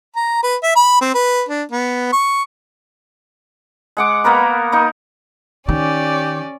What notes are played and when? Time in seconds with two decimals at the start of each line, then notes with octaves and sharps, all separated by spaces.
0.16 A#5
0.43 B4
0.63 E5
0.76 B5
1.01 C4
1.14 B4
1.49 D4
1.72 B3
2.13 C#6
3.97 G#3 F#5 D6
4.24 A#3 B3 A#4 B4
4.72 A#3 D#4
5.69 D#3 C#4 G4 D5